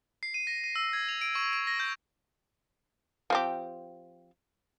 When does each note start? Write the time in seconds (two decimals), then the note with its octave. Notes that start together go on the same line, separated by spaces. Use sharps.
0.23 C7
0.34 D#7
0.47 A#6
0.64 D#7
0.76 E6
0.93 G#6
1.08 F7
1.21 D7
1.35 C#6
1.53 D7
1.67 A#6
1.80 G6
3.30 F3 C4 G4